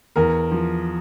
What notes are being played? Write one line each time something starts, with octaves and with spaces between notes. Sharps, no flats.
E2 A#4
F3